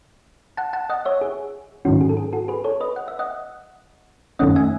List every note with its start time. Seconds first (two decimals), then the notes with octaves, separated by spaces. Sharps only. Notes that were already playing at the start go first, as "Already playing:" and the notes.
0.57 F#5 A5
0.73 F#5 A5
0.90 D#5 F#5
1.05 C#5 E5
1.21 G#4
1.85 G#2 D#3 F#3 C#4 F#4
2.01 G#4
2.09 A4
2.17 G#4
2.33 F#4 A4
2.48 G#4 B4
2.64 A4 C#5
2.80 B4 D#5
2.96 F#5
3.08 E5
3.19 D#5 F#5
4.39 F#2 D#3 A3 C#4 D#5 F#5
4.56 E5 G#5